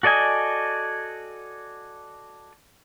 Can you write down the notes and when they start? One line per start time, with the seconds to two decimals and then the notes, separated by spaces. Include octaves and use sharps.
0.03 F#4 A4 D5 D#5 G#5